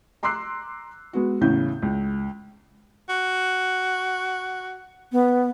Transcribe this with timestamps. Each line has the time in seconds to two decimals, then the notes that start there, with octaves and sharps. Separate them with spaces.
0.23 A#5 C6 D6 E6 F#6 C7
1.13 G#3 B3 F#4
1.41 E2 A2 C#3 C#4 G6
1.82 C#2
3.09 F#4
5.12 B3